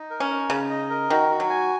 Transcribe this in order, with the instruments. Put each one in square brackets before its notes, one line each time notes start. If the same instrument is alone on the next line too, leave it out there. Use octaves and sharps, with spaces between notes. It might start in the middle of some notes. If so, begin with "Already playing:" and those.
Already playing: [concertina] D#4
A#4
[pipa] C#4
[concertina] D#4
[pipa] C#3 [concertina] D#4
[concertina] D#5
A#4
[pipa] D#3 [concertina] F#4
[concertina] F#4
[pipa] F#3
[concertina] G#5